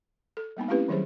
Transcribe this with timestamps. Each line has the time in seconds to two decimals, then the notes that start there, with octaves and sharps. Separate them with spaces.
0.37 A4
0.57 G3 A#3 B3 D#4
0.68 A3 C4 C#4 E4 G4 B4
0.88 D#3 F#3 G3 G#4 C5